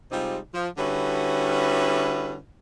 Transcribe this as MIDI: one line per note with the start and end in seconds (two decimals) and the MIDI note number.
0.12 0.38 48
0.12 0.38 55
0.12 0.38 56
0.12 0.38 60
0.12 0.38 63
0.12 0.38 65
0.54 0.68 53
0.78 2.36 50
0.78 2.36 55
0.78 2.36 61
0.78 2.36 64
0.78 2.36 66
0.78 2.36 71